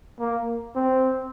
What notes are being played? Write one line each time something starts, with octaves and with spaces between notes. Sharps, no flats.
A#3
C4